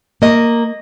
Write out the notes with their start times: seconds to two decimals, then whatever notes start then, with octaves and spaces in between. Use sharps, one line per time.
0.22 A#3 D#5